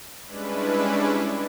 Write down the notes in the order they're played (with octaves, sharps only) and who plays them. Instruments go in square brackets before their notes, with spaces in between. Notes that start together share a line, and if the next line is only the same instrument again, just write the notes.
[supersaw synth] G3 G#3 C#4 D4 E4 B4